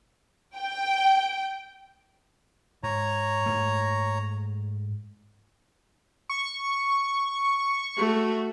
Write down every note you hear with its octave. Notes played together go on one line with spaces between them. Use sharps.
G5
G#2 C#5 A#5
G#2 A3
C#6
A3 F#4